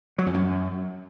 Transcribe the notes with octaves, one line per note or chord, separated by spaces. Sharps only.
F#3
F2
F#2